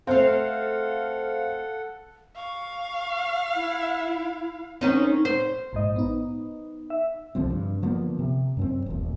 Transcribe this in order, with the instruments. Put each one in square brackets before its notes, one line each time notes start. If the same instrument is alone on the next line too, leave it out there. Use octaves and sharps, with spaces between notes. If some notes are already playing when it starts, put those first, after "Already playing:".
[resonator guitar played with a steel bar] A3 C4 [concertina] A4 F#5 [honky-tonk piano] C5 [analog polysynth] F5
[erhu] F5 [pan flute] C#6
[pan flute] E4
[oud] D#3 C#4 D#4 [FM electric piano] C4
[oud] C5
[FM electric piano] A#1 G#2 D#5
B3 D#4
E5
[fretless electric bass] C2 D3 F3 C4
G2
D3 F3 A#3 B3
C3
F#2 B3 C4
D#1 A1